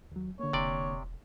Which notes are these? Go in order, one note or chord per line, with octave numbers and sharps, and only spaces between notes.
D#2 F#3
D3 A#3 C#5
E1 C3 D5